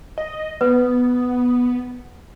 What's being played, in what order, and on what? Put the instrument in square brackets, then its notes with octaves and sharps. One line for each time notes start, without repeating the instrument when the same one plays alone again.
[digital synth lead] D#5
[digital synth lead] B3 [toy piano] B4